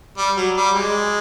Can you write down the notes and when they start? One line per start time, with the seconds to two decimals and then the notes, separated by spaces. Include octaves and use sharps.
0.18 G3
0.37 F#3
0.57 G3
0.76 G#3